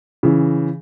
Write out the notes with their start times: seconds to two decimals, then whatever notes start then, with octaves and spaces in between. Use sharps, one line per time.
0.23 C#3 E3